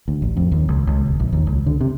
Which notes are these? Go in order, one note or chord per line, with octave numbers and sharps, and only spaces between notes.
D2
A1
F2
D#2
C#2
C#2
D#1
A#1
D#2
C#2
D3
C3